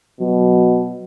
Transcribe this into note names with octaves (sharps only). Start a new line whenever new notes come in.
B2 F#3